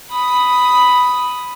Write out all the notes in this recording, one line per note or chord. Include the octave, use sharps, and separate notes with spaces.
B5 D#6